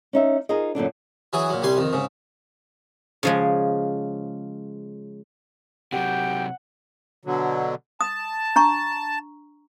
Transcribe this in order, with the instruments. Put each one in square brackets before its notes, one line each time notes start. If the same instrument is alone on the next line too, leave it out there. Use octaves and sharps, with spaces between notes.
[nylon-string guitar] C#4 D#4 E5
D#4 F4 G#4 A#4 C5 D#5
F#2 A#2 D3 D4
[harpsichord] E3 F#3 G#4
A#2 F#3
C2 G3 G#5 C6
F2 D#3
G#2 C#3
[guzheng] C#3 F3 G#3
[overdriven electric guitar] C3 F#3 [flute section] G4 G5 [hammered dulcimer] F#5
[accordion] B2 D3 F#3
[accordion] A5 [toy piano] D#6
[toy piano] D4 A#5 C#6